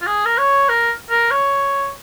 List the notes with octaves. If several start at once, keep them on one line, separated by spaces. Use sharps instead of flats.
F4
G#4
A#4
C#5
A#4
A#4
C#5